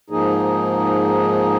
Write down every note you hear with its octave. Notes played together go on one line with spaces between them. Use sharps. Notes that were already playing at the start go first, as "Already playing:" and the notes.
G#2 F3 A#3 D#4 G#4